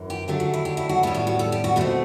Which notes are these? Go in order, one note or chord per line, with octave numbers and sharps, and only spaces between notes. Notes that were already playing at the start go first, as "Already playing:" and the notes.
Already playing: F#2 E3
G4
D3 F#3 A3 D4 G4
F#4
E4
G4
E4
F#4
A2 G3 B3 E4
F#4
F#4
A4
G4
F#4
B2 A3 C4 F#4